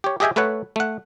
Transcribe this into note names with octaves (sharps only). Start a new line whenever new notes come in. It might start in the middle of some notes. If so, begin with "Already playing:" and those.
G4 C#5
G4 G#4 D#5 E5 G5 G#5
A3 A4 B4 C#5 F#5
A3 F#5